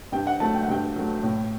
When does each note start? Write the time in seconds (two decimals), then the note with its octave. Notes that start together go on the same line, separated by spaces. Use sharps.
0.12 G2 G5
0.27 F#5
0.40 F#3 A3 A5
0.54 G5
0.63 F#5
0.68 G2 G5
0.96 F#3 A3
1.23 A2